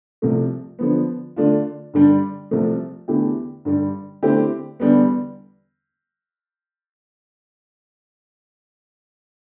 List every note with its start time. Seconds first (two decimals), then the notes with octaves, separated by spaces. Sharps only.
0.22 C2 C3 F3 A3
0.79 D3 F3 B3
1.36 D3 A3 D4 F4
1.94 G2 D3 G3 D4
2.51 C2 C3 F3 A3
3.08 E2 D3 A3 E4 G4
3.65 G2 D3 G3
4.23 D3 A3 C4 E4 G4
4.80 E2 D3 G3 B3